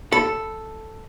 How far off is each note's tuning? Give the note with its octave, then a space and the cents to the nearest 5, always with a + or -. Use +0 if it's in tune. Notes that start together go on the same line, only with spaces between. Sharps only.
A4 +0 B5 +0